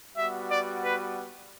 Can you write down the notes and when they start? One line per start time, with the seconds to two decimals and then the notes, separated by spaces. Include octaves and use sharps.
0.15 G3 B3 F#4 E5
0.49 D5
0.83 B4